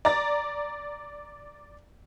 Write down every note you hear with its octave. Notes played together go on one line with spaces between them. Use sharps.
D5 A#5 A6